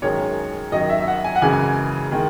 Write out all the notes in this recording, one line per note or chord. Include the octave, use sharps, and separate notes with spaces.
F#2 D#3 G#3 C#5
F#2 D#3 F#3 D#5
E5
E5
F#5
G#5
F#5
F#2 C#3 E3 G#3 G#5
D#3 G#3